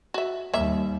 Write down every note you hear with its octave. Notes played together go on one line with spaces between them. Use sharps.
F#4 E5
D#2 G3 A#3 E5